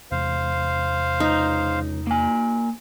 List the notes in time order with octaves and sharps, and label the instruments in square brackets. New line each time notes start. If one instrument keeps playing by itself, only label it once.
[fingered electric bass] E2 C3 G#3 [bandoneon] C5 F5
[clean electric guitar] C#2 [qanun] D#4
[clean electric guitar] A#3 G#5